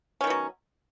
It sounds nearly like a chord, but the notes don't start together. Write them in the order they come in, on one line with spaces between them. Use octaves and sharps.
C#4 D#3 B3 F#3